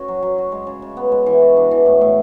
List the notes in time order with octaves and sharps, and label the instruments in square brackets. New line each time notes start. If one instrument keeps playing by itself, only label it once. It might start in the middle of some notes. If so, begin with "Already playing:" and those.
Already playing: [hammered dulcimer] C#4 F#4
F#3
F#3
F#4
G#3
C#3
C#3
B3
G#3
E3
F#4
D4
E3
A2
A2